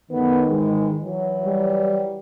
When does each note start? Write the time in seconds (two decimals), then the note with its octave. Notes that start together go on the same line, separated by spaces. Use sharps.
0.11 F#2 D#3 A3 B3
0.47 G#2 E3 G#3
1.03 E3 F#3
1.46 G3